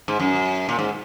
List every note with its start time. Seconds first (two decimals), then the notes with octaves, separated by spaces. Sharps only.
0.08 G#2
0.20 F#2
0.69 A#2
0.79 G#2